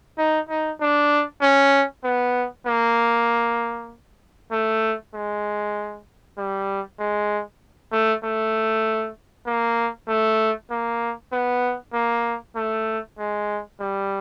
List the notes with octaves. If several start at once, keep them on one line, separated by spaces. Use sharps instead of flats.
D#4
D#4
D4
C#4
B3
A#3
A3
G#3
G3
G#3
A3
A3
A#3
A3
A#3
B3
A#3
A3
G#3
G3